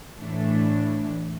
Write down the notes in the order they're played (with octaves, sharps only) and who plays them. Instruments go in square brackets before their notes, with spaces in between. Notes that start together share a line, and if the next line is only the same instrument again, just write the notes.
[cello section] A2 E3 A3 D4